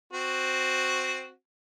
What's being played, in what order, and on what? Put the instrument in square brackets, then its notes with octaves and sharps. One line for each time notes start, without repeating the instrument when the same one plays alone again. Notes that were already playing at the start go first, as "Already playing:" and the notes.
[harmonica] C4 F#4